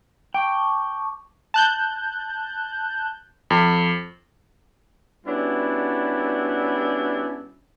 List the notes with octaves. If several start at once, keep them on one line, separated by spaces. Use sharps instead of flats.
G5 A5 C#6 D6
A5 F#6 G6
F2
G3 B3 C#4 D4 E4 F#4